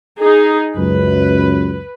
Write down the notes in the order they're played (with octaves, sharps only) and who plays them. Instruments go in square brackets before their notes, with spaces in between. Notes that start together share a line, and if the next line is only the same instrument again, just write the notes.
[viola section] D#4 G#4
[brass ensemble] C#2 F#2 [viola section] B4